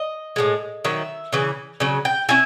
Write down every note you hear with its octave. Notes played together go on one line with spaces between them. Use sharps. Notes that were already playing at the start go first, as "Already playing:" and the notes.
Already playing: D#5
A2 F3 G#3
D#3 F#3 E5
C#3 E3
C#3 F#3
G5
C#4 E4 G#5